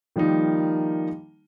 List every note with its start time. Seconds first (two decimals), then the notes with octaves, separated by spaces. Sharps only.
0.16 D#3 F3 G3 A#3 D#4